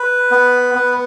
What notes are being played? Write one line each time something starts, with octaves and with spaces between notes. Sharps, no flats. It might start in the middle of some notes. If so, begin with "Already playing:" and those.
Already playing: B4
B3
B3